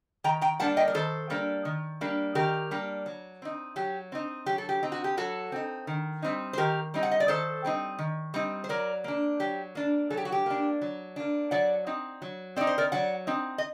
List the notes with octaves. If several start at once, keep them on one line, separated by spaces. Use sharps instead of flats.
D#3 G5 A#5
G5 A#5
G3 A#3 D4 F#5 A5
D#5 G5
A#4
D#3 A4 C5
G3 A#3 D4
D#3
G3 A#3 D4
D#3 G4 A#4
G3 A#3 D4
F#3
C4 D#4
F#3 G4
C4 D#4
F#3 G4
A4
G4
C4 D#4
F#4
G4
F#3 F#4 A4
C4 D#4
D#3
G3 C4 D#4
C5
D#3 G4 A#4
G3 C4 D#4
F#5
D#5
D5
D#3 A4 C5
G3 C4 D#4
D#3
G3 C4 D#4
C5
F#3 A#4 D5
A#3 D4
F#3 G4
A#3 D4
F#3 A4
G4
F#4
G4
A#3 D4
F#3
A#3 D4
F#3 D5 F#5
C4 D#4
F#3
C4 D#4 D5
C5
A#4 D5
F#3 D5 F#5
C4 D#4
D#5